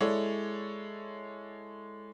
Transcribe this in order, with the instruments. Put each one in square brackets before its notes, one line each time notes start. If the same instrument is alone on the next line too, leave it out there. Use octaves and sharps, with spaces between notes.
[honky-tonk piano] G#3 E4 A4 C#5 D5